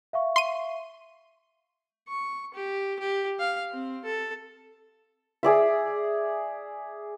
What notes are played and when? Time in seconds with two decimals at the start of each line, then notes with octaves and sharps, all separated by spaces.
0.13 E5 F5 C#6
0.36 C6 D#7
2.08 C#6
2.54 G4
2.99 G4
3.39 F5
3.72 C4
4.05 A4
5.43 G#4 D5 E5